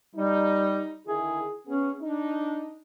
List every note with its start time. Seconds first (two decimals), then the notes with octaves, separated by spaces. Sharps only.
0.16 G3 D#4
1.07 D3 D#3 E4 G#4
1.67 B3 C#4 G#4
2.01 D4 D#4